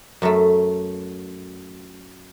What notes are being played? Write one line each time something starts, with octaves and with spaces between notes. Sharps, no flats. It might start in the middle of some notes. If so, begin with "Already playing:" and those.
F#2 F#3 A3